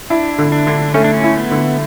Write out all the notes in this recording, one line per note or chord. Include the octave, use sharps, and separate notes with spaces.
D4 E4
D3
D4
D3
A3 C#4
D4
C#4
E4
B3
D3